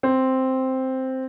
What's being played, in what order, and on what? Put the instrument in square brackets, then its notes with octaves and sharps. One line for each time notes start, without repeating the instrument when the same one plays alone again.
[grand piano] C4